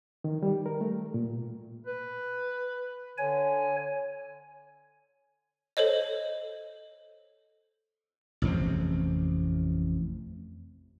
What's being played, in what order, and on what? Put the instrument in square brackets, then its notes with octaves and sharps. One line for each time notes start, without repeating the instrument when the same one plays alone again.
[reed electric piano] D#3
G3
A#4
A3
A#2
[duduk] B4
[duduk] D3 [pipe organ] C#5 G#5
[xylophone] A4 C5 C#5 D#5
[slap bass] A1 F2 C3 C4